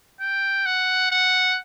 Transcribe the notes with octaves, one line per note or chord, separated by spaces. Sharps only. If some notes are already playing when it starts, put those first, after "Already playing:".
G5
F#5
F#5